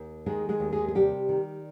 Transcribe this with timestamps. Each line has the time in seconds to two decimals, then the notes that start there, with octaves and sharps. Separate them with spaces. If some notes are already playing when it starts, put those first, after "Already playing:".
Already playing: D#2
0.26 D#3 G#3 G#4
0.49 G#3 G#4
0.60 D#2
0.72 G#3 G#4
0.88 G#4
0.95 C3 G3 G4
1.29 D#3